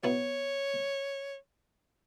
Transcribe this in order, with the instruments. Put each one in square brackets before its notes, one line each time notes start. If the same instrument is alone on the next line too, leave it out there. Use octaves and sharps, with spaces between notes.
[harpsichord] F#3 B3 E4 [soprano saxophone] C#5